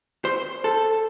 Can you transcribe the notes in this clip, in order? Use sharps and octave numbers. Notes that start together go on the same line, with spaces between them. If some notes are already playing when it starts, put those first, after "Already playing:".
C5
A4